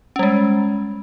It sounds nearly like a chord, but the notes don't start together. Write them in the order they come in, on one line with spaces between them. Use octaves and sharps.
C#4 G3 G#3